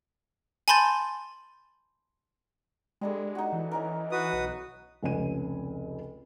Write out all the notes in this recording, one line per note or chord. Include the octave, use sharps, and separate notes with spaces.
G#5 A5 B5 C6 G6 A6
G3 G#3 D4 A4
D#4 F#4
E3
C#4 D#4 A#4
F#4 B4 D#6
B1
F1 C#2 C3 C#4 G#5 D#7